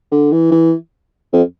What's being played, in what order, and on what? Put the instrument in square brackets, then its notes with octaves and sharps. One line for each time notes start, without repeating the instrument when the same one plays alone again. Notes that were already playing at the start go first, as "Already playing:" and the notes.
[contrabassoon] D3
E3
E3
F2